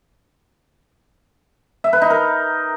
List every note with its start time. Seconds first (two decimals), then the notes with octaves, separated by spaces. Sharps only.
1.84 E5
1.93 B4
2.02 D#4
2.10 A#4